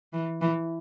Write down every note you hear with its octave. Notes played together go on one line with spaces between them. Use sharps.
E3
E3